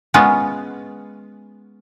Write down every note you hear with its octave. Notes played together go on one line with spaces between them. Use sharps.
G#3 B3 C#4 F4